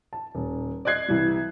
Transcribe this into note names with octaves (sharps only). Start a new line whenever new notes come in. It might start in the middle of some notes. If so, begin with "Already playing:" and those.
A5
D#1
D5 D#5 F#6 G#6 C7
C2 E3 G3